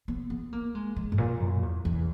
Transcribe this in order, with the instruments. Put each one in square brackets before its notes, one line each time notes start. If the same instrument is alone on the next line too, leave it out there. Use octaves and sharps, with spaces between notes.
[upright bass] B3
B3
A#3
G#3
G#3
G#2
A#2
F#2
E2
E2